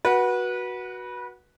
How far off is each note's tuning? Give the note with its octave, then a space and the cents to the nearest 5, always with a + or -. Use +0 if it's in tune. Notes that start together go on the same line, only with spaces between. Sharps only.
F#4 +0 B4 -25